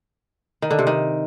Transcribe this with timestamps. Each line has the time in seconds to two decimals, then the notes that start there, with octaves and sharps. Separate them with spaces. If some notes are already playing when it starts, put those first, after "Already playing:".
0.62 D#3
0.70 D3
0.79 C3
0.87 D#3